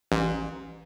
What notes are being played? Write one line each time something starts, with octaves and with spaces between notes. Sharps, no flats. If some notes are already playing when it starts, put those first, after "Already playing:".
A1